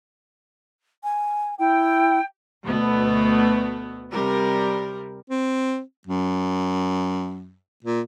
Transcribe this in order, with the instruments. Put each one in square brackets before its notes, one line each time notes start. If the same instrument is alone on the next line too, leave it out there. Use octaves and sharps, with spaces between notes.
[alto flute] G#5
[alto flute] E4 [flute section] G5
[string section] D2 B2 A3 B3
C3 G3 A#4
[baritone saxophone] C4
F#2
A#2